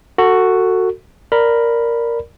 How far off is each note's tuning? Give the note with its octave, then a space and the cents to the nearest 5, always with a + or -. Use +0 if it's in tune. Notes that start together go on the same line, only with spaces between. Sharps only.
F#4 +0 A4 +30
A#4 +0 D5 +0 B5 +0